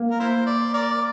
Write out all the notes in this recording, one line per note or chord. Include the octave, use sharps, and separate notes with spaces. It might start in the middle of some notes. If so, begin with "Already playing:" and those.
Already playing: A#3
A#4
E4 C5
D5
A#4 D5